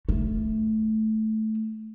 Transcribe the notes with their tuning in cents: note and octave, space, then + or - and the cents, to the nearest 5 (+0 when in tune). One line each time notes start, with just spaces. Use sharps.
A3 -10